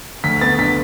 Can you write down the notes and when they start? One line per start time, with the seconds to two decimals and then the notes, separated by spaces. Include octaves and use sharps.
0.24 D2 B6
0.41 B3 A6
0.58 D3 B6